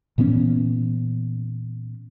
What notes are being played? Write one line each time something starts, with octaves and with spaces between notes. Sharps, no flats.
A#2 E3 B3 C#4